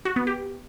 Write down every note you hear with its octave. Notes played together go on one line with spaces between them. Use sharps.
F#4
B3
G4